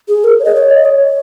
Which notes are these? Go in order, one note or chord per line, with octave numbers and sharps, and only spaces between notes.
G#4
A#4
C#5
D#5
C#5
D#5
C#5